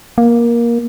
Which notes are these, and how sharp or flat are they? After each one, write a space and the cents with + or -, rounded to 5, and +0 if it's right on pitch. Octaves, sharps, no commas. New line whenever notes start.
A#3 +15